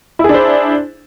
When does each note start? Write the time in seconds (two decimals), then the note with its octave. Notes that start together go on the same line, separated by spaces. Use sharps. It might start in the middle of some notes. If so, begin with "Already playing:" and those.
0.19 E4
0.24 G#4
0.29 D4
0.34 C5